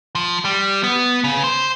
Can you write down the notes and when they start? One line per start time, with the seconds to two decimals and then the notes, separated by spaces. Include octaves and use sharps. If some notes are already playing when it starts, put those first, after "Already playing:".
0.15 F3
0.45 G3
0.84 B3
1.24 C#3
1.44 C5